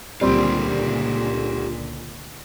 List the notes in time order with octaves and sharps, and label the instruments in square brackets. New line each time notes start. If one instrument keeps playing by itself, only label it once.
[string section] C#2 A#2 D3 [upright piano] G3 C4 [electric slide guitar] F4 G4